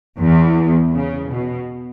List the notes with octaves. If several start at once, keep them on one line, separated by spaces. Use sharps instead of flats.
E2
C#3
B2